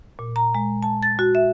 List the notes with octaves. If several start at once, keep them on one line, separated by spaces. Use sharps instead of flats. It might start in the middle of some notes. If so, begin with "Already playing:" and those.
A#2
A#5
G#3
A5
A6
F#4
E5